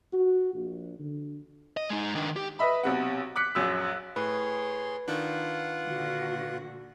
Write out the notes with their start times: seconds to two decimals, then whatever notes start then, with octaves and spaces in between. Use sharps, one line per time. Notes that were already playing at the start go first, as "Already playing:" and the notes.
0.11 F#4
0.54 A#1
0.98 D3
1.77 D#5
1.90 G#3 D#4
2.15 D#3 D4
2.36 G4
2.59 B4 D#5 E5 B5
2.83 B1 C3 F#5
3.36 D6 F#6 B6 C#7
3.55 A#1 F#2 E6
4.16 A2 G#4 B4 C#5 C6
5.08 D#3 D4 F4 F#5
5.87 A#2 D3 F#4